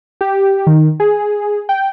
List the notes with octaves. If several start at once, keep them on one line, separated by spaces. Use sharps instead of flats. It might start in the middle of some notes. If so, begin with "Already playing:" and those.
G4
D#3
G#4
G5